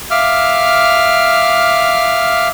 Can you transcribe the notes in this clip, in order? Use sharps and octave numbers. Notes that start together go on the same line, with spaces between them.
E5 F5 D6 F6